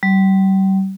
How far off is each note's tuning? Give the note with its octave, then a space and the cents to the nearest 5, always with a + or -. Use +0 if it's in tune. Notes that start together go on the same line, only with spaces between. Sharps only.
G3 -35